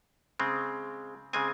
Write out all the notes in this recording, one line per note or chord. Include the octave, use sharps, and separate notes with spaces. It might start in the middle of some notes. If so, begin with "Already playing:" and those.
C#3 G#3 C4
C#3 G#3 C4 G#5